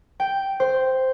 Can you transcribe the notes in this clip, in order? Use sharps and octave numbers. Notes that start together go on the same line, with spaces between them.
G5
C5